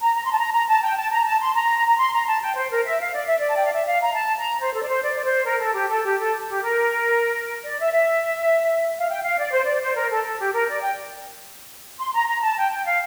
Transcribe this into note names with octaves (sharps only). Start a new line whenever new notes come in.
A#5
A#5
C6
A5
A#5
A#5
A5
G5
A5
A#5
A5
C6
A#5
A#5
C6
A#5
A5
G5
C5
A#4
E5
F5
D5
E5
D5
A5
G5
F5
E5
F5
A#5
A5
A#5
C5
A4
D5
C5
D5
D5
C5
A#4
A4
G4
A4
G4
A4
G4
A#4
D5
E5
E5
F5
G5
F5
D5
C5
D5
C5
A#4
A4
A4
G4
A#4
D5
G5
C6
A#5
A#5
A5
G5
G5
F5